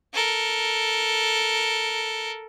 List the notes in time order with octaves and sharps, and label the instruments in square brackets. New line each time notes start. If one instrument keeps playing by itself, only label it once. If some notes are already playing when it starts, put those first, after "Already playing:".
[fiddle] A4 A#4